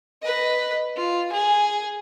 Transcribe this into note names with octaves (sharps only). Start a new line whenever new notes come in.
B4 D#5
F4
G#4